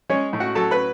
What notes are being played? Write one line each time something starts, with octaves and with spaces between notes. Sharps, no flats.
G#3 C#4 C#5
A2
F#4 F#5
F#3 A4 A5
B4 B5